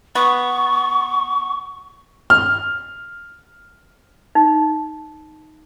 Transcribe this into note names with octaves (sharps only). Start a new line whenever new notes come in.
B3 C#6
F6
D#4